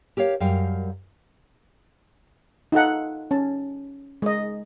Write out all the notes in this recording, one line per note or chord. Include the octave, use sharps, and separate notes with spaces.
G4 A#4 C#5 F5
F#2 G3 A#4 F5 G5
D#4 F4 A4 F#5
C#4 A5
G#3 D#5